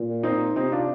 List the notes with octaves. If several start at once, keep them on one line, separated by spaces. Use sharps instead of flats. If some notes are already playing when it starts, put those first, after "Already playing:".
Already playing: A#2
C4 D#4
C3 C4 D#4
D4 F4